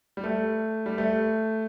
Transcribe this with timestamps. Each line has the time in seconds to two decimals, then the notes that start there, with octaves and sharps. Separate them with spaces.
0.17 G3
0.24 A3
0.86 G3
0.98 A3